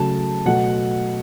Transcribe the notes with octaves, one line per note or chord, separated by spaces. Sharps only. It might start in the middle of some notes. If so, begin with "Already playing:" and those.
Already playing: C#3 F#3 A3 A5
B2 F#3 A3 F#5